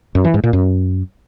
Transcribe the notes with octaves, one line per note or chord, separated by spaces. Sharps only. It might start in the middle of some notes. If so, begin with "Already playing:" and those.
F#2
E3
G#2
A#2
F#2